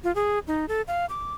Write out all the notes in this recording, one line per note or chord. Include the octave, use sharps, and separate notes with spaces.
F4
G#4
D#4
A4
F5
D6